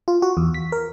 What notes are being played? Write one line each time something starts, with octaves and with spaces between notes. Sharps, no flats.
F4
F#4
E2
B6
A#4